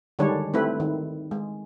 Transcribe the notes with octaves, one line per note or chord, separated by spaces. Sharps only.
D3 D#3 G3 G#3 D4 C#5
A3 C4 E4 B4
D#3
G#3